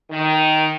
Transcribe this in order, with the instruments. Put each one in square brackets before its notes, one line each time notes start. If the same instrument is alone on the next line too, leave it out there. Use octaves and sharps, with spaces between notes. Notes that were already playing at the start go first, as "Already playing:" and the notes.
[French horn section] D#3